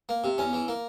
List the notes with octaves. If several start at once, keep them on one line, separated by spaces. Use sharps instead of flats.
A#3
C3
E2 C#4
E3
A#3